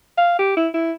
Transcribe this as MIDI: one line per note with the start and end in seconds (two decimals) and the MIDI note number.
0.18 0.37 77
0.39 0.53 67
0.57 0.68 64
0.74 0.92 64